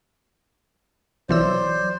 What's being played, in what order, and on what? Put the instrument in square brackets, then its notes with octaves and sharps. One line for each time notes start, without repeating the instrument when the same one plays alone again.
[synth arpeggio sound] B1 E3 E6 [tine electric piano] F#3 [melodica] C5 D5